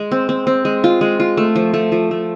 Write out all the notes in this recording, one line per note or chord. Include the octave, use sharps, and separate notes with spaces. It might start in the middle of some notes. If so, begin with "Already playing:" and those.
Already playing: G#3
C4
C4
C4
G#3
F4
G#3
F4
A3
F3
A3
F3
A3